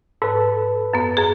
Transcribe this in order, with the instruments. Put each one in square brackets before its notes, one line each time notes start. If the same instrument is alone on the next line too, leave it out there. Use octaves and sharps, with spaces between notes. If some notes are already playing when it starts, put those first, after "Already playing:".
[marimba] G#2 [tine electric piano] A4 B4
[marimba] F#2 B3
F#2 G#4